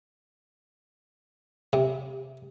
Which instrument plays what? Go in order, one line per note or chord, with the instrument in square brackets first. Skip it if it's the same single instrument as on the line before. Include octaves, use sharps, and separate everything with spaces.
[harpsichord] C3